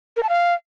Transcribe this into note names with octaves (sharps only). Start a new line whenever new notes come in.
A#4
A5
F5